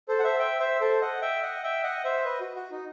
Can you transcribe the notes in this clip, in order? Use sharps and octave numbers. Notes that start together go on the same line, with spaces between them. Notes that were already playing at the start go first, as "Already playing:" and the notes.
A4 C5
F#5
C5 E5
E5 G5
C5 E5
A4 C5
D#5 F#5
E5 G5
D#5 F#5
E5 G5
D#5 F#5
C5 E5
B4 D#5
F#4
F#4
D#4